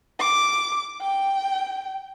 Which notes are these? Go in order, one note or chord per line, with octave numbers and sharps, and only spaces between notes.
D6
G5